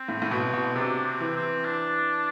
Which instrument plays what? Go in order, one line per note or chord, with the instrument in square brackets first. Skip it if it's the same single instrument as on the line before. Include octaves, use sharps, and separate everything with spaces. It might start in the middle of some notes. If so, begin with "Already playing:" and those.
Already playing: [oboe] C4
[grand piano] A2
A2
[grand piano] B2 [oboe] C4
[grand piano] B2
[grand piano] C3 [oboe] D4
[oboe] C4
[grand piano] E3
[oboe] C4
D4